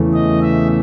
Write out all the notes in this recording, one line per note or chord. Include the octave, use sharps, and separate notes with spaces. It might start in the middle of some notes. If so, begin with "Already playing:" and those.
Already playing: E2 C#3 E3 A3
D#5
E5